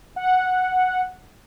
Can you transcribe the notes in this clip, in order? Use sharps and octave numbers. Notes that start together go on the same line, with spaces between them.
F#5